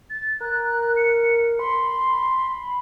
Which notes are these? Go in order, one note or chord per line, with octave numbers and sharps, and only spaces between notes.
A6
A#4 F#6
C#7
B5 C6